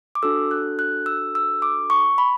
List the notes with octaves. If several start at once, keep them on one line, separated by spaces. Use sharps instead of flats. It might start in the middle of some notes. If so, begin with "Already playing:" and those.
D6
D4 F#4 A4 E6
F#6
F#6
E6
E6
D6
C#6
B5